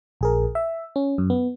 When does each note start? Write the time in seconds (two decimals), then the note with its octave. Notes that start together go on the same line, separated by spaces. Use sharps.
0.21 A#1 G#4 A#4
0.55 E5
0.96 C#4
1.18 F#2
1.30 B3